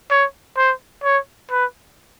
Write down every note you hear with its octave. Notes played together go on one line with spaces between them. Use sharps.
C#5
C5
C#5
B4